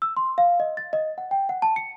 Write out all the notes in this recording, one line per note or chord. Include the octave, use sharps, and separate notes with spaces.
E6
C6
F5
D#5
A6
D#5
F#5
G5
F#5
A5
C#7